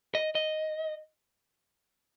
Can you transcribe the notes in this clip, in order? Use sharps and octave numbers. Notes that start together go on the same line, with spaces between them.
D#5
D#5